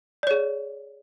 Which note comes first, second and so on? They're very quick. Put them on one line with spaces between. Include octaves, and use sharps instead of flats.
D5 C#5 G#4